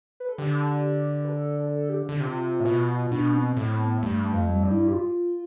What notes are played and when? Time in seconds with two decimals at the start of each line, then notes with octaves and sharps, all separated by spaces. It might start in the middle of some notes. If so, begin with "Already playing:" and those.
0.20 B4
0.29 A4
0.38 D3 G4
1.25 B4
1.29 A4
1.60 A4
1.89 G4
2.09 D3
2.20 C3 F4
2.60 A2
2.66 B2
3.12 B2 D4
3.34 C4
3.57 A2 C4
3.69 C4
3.80 B3
4.03 G2 A3
4.25 A3
4.33 F2
4.48 G3
4.63 G2
4.71 E4
4.88 G4
4.93 F4